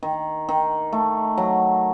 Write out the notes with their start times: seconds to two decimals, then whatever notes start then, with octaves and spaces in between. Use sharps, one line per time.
0.03 D#3
0.49 D#3
0.93 A3
1.38 F#3